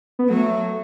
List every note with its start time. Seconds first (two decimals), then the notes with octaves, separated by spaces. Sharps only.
0.19 B3
0.29 F#3 A3